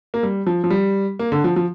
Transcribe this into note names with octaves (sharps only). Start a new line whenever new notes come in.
A#3
G3
F3
F3
G3
A#3
D3
F3
F3